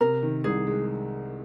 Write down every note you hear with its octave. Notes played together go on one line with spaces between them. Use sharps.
C3 A#4
D#3
C2 G#4
G#3